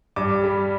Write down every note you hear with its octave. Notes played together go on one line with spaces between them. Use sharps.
G2 D6
G3